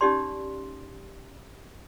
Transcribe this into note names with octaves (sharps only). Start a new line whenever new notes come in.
C#4 D#4 G4 D5 C6